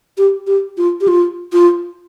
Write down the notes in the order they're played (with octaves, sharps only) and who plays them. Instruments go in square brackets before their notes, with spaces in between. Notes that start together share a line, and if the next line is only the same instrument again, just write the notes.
[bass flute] G4
G4
F4
G4
F4
F4